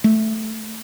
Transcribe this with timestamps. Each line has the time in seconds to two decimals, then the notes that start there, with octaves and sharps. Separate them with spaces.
0.04 A3